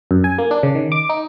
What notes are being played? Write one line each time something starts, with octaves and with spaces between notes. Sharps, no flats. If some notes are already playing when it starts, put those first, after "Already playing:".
F#2
G#5
A#3
D4
C#3
D#3
D6
D#4